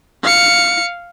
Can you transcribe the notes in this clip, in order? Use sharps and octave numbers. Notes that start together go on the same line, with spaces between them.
F5 C#7